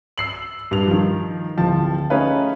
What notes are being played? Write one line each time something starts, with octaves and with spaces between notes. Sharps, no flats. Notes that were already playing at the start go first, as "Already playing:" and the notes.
E6 C7 F#7
G2 F7
D#3 F3
D1 F3 A5
A3 C#4 D#4 G#4 B4 F5